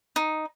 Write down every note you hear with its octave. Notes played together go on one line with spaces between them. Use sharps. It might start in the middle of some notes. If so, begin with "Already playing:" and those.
D#4